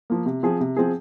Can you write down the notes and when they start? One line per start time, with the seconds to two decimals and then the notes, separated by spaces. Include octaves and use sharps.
0.10 F3 A#3
0.26 C3
0.43 F3 C4 G#4
0.60 C3
0.77 F3 C4 G#4